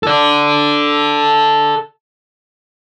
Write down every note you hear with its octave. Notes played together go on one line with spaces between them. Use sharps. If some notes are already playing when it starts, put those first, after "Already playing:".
A4 D5